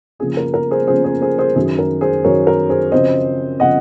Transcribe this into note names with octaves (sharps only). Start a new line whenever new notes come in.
C#3 F3 A#3 C#4 G#4
A#4
A#4
G#4 C5
C#3 F3 A#3 C#4 G#4 C5
G#4 C5
G#4 C5
G#4 C5
F#2 D#3 F#3 G#4
A#4
G#4 C5
F#2 D#3 F#3 A#4 C#5
A#4
G#4 C5
F#2 C#3 F3 C4 C5 D#5
C#3 F3 C4 D#5 F#5